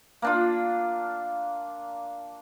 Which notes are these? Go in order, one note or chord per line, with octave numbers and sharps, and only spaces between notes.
A#3 D4 F4